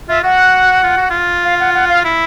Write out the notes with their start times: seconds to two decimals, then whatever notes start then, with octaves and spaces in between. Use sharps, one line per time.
0.09 F4 E5
0.23 F#4 F#5
0.83 F4
0.97 F#4
1.10 F4
1.44 F5
1.60 F#5
1.74 F#5
1.89 F5
2.05 E4